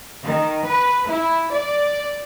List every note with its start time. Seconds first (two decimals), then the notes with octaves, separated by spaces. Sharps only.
0.24 D#3
0.67 B4
1.09 E4
1.53 D5